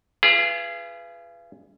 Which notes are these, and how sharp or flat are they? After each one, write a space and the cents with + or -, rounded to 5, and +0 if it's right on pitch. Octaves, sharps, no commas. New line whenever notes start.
F4 -40 G#4 +0 B4 +0